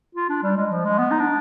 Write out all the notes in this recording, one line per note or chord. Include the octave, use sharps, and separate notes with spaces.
F4
D4
G3
G#3
F3
G#3
B3
D#4
D4